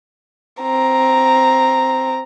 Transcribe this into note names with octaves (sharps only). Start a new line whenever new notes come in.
C4 A#5